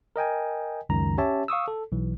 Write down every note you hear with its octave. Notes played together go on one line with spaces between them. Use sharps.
A#4 D#5 G5 G#5
C#2 F#2 D#3 A#5
C#4 G4 C#5 E5 A5
F5 C#6 D#6 E6
A4
B1 E3